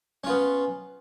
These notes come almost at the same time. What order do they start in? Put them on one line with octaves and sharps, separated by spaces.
C#4 F4 B3